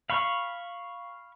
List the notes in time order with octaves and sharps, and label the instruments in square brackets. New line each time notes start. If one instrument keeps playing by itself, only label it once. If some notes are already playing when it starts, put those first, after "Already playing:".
[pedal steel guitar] F5 B5 C#6